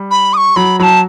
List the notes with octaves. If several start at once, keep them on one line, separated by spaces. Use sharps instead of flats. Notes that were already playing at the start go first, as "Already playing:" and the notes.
Already playing: G3
B5
D#6
C#6
F#3 B5
F#3 A5 B5